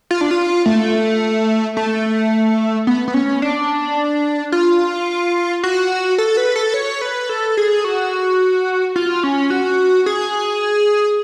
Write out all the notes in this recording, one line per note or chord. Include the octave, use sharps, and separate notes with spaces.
F4
D4
F4
A3
A3
B3
B3
C#4
D4
F4
F#4
A4
B4
A4
C#5
B4
A4
G#4
F#4
F4
C#4
F#4
G#4